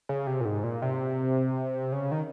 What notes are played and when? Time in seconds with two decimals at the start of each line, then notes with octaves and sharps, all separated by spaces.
0.09 C#3
0.27 C3
0.41 A#2
0.45 G#2
0.64 A#2
0.82 C3
1.92 C#3
2.11 D#3